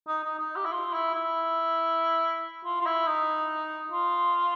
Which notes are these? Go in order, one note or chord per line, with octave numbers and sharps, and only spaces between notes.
D#4
D#4
D#4
G4
E4
F4
E4
E4
F4
F4
E4
D#4
F4